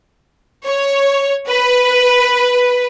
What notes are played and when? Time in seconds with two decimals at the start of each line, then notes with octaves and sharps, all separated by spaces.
0.67 C#5
1.50 B4